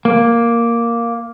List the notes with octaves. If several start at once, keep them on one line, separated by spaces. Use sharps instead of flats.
A#3